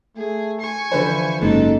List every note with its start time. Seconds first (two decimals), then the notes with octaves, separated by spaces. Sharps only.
0.17 A3 G#4
0.61 G#5 C#6
0.92 D3 E3 F3 B4 C5
1.41 F#1 G#2 D#4 A4